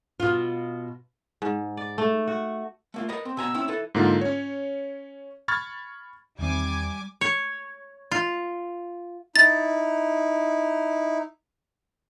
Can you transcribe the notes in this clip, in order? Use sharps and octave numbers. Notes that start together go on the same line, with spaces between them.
B2 F4
G#2
D5
A3
F#4
A3 A#3 F4
A#4 B4 D#5
C4
B2 G#5 A#5 E6
C4 C#4 E4
E4 A4 B4
G#2 D3 A#3 F4
C#4 C#5
B5 C#6 F6 G#6 A6
E2 D#3 G3 C4 G#5 D6
C#5
F4
D#4 E4 A6